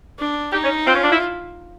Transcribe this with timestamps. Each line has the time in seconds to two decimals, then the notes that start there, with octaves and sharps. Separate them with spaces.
0.19 D4
0.53 D#4 G4
0.64 C#4
0.87 C4 F4
0.94 C#4
1.03 D4
1.11 E4